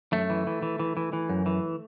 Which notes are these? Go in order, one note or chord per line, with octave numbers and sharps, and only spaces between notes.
F#2 A3
E3
E3
E3
E3
E3
E3
F#2
E3